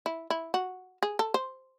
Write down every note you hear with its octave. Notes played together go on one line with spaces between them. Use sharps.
E4
E4
F#4
G#4
A4
C5